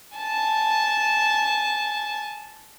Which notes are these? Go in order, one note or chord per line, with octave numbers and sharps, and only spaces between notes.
G#5 A5